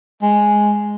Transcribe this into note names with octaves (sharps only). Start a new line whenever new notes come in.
G#3